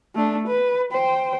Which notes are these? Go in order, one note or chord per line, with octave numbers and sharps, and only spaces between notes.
A3 D4
B4
C5 G5